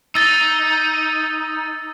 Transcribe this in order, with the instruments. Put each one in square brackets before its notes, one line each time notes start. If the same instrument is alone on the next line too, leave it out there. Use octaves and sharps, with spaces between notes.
[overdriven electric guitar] D#4 [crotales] E6 A6